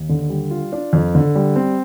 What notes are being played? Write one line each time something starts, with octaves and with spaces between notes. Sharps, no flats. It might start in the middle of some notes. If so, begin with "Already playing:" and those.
Already playing: D#2
D3
G3
F4
D4
F2
D3
G3
C4